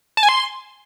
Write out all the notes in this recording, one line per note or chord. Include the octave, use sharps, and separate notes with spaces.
A5
G#5
C6